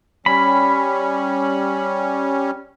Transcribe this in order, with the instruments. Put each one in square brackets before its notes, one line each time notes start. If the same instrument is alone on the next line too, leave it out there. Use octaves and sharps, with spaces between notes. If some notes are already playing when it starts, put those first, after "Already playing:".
[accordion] G3 C#4 [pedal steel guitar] B5